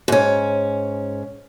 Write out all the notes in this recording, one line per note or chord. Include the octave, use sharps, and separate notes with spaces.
G#2 C#4